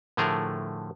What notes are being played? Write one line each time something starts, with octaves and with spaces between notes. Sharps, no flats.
A2 D3 F3 A3 G#4 A#4